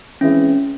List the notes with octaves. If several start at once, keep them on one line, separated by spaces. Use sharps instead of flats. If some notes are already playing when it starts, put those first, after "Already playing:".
E3 G#3 C4 C#4 E4